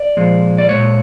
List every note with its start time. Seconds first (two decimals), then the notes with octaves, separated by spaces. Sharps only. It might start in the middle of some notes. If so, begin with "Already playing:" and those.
Already playing: D5
0.17 A#2 F3 G#3
0.58 D5
0.69 A#2 F3 G#3 C#5